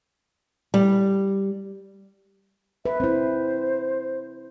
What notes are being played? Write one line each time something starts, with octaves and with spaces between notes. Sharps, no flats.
G3
B4 E5
C4 E4 C5